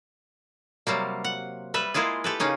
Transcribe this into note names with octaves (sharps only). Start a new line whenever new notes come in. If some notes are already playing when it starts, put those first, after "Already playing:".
C3 F#3 G3 A#3
F#5
G3 B4 E5
G#3 A#3 E4 F4 G#4
G4 A4 B4
C#3 A#3 C#4 D#4